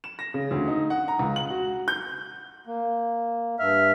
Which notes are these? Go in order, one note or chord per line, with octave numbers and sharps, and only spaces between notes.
E7
A#6
C#3
D2
D#4
F#5
A#5
C#2
F#7
F#4
G6
A#3
G2 E5 F6